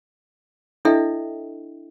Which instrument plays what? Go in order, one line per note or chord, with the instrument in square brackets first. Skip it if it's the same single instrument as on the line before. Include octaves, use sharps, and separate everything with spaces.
[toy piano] D4 E4 A4 D#5 E5 G5